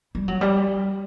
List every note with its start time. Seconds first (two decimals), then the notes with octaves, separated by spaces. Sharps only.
0.15 G3
0.28 F#3
0.41 G3